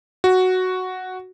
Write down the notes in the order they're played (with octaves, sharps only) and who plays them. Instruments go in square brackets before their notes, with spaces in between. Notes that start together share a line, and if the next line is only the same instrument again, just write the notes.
[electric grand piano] F#4